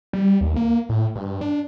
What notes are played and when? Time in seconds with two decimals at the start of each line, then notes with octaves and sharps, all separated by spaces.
0.13 G3
0.41 D#2
0.56 A#3
0.89 A2
1.16 G2
1.41 D4